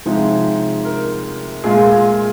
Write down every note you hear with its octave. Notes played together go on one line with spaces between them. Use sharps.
C3 F3 G#3 D#4
A#4
A#2 G#3 F4 G#4